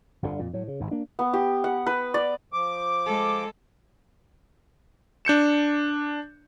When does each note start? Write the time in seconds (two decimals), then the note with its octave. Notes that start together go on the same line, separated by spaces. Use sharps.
0.22 G1 F2 B2 D3
0.39 F2 A#2
0.53 A2 F#3
0.68 C#3
0.80 G#1 G#2
0.91 A#3 D4
1.19 B3
1.33 G4
1.64 F#5
1.87 B4
2.14 D5
2.53 F3 D6
3.06 G#3 A4
5.25 D4 G6 C#7 E7